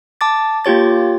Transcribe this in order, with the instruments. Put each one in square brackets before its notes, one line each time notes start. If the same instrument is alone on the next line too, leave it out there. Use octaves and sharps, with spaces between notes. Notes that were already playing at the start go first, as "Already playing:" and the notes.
[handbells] A5 D6 A6
A#3 F4 G4 C#5 A6